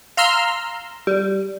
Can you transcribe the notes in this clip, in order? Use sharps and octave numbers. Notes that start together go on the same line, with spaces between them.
F5 A#5 C6 E6 F6
G3